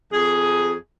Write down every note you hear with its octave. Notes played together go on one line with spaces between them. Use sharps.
F2 G#4